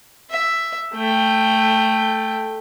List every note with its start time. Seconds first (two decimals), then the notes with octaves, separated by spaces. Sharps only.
0.30 E5
0.95 A3 G5